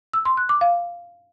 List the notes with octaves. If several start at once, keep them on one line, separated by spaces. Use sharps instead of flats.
E6
C6
F#6
D6
F5